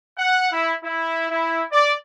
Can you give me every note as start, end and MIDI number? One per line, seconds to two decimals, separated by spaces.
0.18 0.48 78
0.52 0.73 64
0.84 1.27 64
1.30 1.63 64
1.72 1.94 74